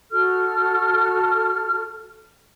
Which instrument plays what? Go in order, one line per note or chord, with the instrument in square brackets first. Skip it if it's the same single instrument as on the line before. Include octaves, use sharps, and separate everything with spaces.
[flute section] F#4 A4 F6